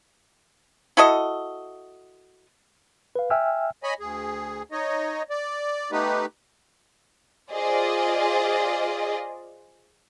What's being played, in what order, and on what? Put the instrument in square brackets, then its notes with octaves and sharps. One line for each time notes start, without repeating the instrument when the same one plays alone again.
[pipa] E4 F#4 A4 D#5
[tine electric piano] B4 F5
E5 G5 G#5 E6 F6
[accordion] C#5 D#5 G#5 B5
D2 G#4
D#4 C#5 D#5
D5
A3 B3 D#4 G4 B4
[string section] F4 G#4 C5 D5 D#5